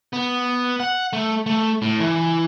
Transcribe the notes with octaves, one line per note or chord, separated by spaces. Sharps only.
B3
F#5
A3
A3
A2
E3